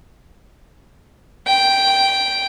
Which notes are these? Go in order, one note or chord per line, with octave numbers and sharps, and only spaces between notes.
G5